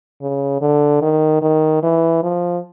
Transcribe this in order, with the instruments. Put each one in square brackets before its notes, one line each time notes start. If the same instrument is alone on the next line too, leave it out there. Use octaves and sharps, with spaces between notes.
[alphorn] C#3
D3
D#3
D#3
E3
F3